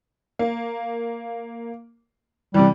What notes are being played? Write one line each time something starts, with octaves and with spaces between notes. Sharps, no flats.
A#3
C3 E3 G3